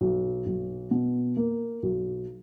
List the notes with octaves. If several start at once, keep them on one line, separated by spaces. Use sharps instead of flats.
B1
B1
B2
A#3
B1